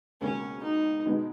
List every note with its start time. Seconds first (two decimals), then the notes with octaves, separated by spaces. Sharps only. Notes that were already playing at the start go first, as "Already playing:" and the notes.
0.21 C#2 B2 A#3 C#4
0.63 D#4
1.05 B2 G#3 B3 D#4